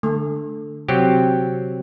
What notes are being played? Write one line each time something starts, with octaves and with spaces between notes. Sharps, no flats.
D3 A3
C3 F#3 C4 G4